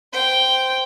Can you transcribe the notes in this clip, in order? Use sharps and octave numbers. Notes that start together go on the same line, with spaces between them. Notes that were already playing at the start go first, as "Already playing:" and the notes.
C5 G5